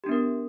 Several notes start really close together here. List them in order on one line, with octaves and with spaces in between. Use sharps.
G4 D4 B3 A#4